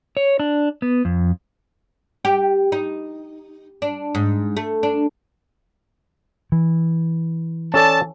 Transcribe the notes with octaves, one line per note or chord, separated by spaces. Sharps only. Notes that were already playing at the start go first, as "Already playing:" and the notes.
C#5
D4
B3
F2
G4
D#4
D4
G#2
A3
D4
E3
C#4 A4 D5 A5